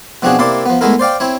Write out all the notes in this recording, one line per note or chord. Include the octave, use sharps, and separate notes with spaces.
B2 F3 C4 D4 F#4 G#4
C3 A#3 E4 D5 C6
F3 B3
G#3 A3 B3 E4 A#4
C5 D5 F5 G5
C4 E4 C#5